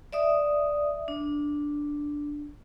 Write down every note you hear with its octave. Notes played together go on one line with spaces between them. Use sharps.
D5 E5 D#6
D4